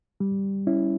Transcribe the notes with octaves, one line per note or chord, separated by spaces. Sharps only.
G3
C#4 E4